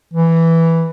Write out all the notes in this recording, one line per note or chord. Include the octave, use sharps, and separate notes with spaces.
E3